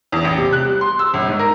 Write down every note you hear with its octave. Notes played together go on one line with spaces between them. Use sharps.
E2
A1
C3
F#6
G3
C6
E6
G1
G#2
A#4